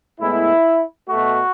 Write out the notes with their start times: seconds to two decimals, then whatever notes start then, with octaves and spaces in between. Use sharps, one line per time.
0.20 A2 G#3 B3 E4
1.09 B2 A3 F#4